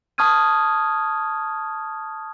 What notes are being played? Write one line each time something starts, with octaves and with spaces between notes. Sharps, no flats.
A5 C#6 D#6 F6 G#6 D#7